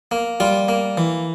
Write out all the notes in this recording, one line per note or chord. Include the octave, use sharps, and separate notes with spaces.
A#3
G3 F4
A#3
E3